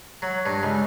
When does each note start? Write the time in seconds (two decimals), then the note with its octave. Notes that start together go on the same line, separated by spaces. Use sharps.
0.22 F#3
0.46 G2
0.63 C#2